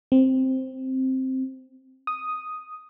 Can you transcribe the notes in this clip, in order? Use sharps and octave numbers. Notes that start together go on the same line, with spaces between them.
C4
D#6